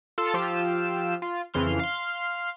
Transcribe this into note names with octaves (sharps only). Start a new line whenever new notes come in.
F4 A4
F3 F4 G4 E6
F4
F2 C#3 E3 C6 F6
F5 C6